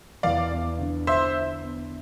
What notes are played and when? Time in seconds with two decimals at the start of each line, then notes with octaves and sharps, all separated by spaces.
0.23 E2 D5 F5
0.51 B3
0.79 D3
1.07 E4 C5 E5
1.35 E4
1.63 B3